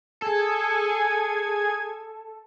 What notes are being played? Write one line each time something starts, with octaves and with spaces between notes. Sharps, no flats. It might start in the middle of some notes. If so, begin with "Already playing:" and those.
G#4 A4 G#5 G#6